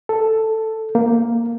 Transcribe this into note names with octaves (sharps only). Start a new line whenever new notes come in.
A4
A#3